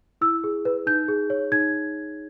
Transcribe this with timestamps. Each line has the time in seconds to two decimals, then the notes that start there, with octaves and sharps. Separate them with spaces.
0.21 E4 E6
0.44 G#4
0.65 B4
0.86 D#4 G6
1.08 G#4
1.30 C#5
1.52 D#4 G#6